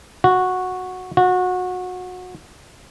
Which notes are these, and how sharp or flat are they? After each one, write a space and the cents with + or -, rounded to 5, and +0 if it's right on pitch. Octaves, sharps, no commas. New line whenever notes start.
F#4 -10
F#4 -25